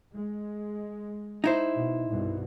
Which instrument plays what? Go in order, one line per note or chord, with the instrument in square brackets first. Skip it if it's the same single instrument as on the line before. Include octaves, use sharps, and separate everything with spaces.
[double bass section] G#3
[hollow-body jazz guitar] D#4 E4 C5
[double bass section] B2
C2 G2 B2